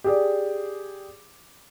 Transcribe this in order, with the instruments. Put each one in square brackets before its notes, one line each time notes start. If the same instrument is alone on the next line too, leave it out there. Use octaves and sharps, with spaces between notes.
[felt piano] G4 G#4 D5